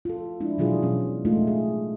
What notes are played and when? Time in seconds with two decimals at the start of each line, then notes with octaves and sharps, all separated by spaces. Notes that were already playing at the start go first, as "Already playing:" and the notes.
0.05 F4 A4
0.41 F3 G#3 D4 E4
0.58 B2 E3 F#3 D4 F4 G#4
0.82 B2 F#3 C#4
1.25 G#3 A3 D#4 F4
1.47 G#4